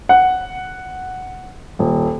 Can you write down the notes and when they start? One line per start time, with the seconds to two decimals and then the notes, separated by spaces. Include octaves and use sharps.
0.09 F#5
1.79 D#1